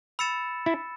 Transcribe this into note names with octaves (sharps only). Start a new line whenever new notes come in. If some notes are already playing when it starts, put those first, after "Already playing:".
B5 E6 A6 C#7 E7
E4